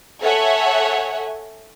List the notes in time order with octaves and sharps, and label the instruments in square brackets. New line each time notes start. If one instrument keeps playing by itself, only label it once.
[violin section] A4 C#5 E5 F#5 G#5